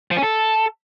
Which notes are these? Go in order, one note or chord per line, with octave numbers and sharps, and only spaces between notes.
F3
C#4
A4